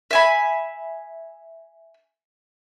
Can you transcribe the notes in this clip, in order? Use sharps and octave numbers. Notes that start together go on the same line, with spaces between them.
E5 G#5 B5